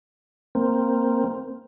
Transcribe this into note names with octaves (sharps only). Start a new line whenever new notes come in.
A#3 C4